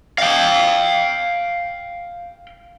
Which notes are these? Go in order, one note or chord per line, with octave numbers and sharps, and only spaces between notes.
F5 G5